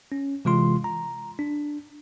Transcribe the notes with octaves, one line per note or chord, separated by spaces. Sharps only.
C#4
C3 E3 G#3 F4 C6
A#5
D4